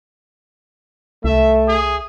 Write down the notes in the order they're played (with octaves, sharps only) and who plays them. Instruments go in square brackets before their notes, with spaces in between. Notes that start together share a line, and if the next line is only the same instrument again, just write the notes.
[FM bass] C2 [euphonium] A3 [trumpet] E5
[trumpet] G#4